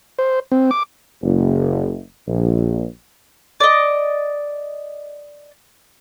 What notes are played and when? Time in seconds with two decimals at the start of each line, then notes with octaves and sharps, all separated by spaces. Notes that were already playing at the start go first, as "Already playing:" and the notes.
0.19 C5
0.52 C4
0.71 D6
1.23 F#1
2.27 A#1
3.60 D5 D#5